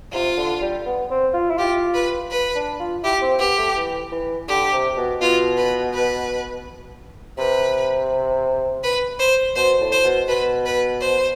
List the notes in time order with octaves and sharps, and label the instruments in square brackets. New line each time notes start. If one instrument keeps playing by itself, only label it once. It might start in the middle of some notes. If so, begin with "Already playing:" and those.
[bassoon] C3 [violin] F4
[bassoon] D3
G3
B3
C4
F4
E4
[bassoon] F4 [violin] G4
[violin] B4
B4
[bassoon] D4
F4
[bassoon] E4 [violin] G4
[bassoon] C4
[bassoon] B3 [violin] G4
[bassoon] A3
E3
E3
[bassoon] D3 [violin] G4
[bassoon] C3
B2
[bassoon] B2 [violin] F4
[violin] B4
B4
[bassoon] C3 [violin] B4
[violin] B4
C5
[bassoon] B2 [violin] C5
[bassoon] A2
[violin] C5
[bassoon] B2
[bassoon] B2 [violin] B4
[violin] B4
C5